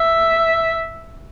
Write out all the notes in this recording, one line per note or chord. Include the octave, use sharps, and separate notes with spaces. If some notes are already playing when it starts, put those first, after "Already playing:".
Already playing: E5